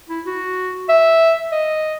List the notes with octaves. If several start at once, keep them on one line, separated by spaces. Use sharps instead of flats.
E4
F#4
E5
D#5